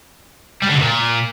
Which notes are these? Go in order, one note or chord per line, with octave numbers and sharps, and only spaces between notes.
G3
D3
C3
A#2